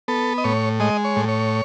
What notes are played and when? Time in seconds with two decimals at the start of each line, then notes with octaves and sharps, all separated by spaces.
0.08 B3 A4
0.38 D#5
0.44 A2 C#5
0.80 G#3 D#5
1.04 C#5
1.16 A2
1.28 C#5